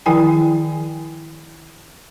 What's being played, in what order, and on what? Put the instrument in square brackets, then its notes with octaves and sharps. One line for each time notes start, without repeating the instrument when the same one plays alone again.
[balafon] D#3 F3 E4 G#4 G5 G#5